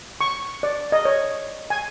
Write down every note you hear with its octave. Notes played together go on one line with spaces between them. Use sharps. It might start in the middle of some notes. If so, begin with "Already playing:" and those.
C#6
D5
D#5
C#5
G#5